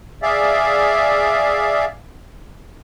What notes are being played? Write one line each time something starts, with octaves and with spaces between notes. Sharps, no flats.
G#4 D5 E5 F5